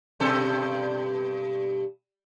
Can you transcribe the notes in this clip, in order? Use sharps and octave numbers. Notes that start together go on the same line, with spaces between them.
G2 B2 A4